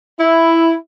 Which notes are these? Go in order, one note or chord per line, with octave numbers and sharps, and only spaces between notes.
E4